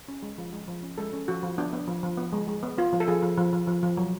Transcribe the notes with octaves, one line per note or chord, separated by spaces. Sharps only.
C#4
G#3
F3
G#3
F3
C#4
G#3 A4
C#4
F3 F#4
F3
B3 D4
B3
F3
F3
B3
G#3
G#3
B3
B3 F4
F3
A4
F3 G#4
F3
F3
F3
F3
F3
F#3